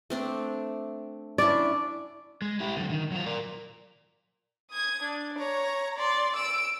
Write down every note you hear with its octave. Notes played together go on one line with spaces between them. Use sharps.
A3 C4 D4
C#4 D4 E4 D5
G#3
E4 G4
D3 F#3
D#3
F#3 F4
A#4 D5
D#6 G#6
D4
C#5 A#5
D5 C6
E6 D7